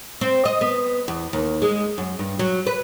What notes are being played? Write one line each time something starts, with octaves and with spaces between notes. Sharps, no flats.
C4
D#5
B3
E2
D#2
G#3
F#2
G2
F#3
B4